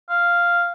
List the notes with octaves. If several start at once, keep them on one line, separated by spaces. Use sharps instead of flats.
F5